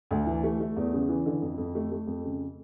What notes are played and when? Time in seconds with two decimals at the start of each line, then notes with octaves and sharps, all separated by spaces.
0.11 D2
0.26 E3
0.44 A3
0.60 A3
0.76 E2
0.93 C#3
1.09 E3
1.26 D3
1.42 F2
1.58 F2
1.75 A3
1.92 A3
2.07 F2
2.24 C#3